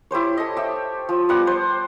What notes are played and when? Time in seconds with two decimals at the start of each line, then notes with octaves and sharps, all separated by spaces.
0.11 E4 G4 C5 C#5
0.37 A4 D#5
0.57 G4 E5
1.09 F3
1.29 G3 B3 D5 F#5
1.47 C5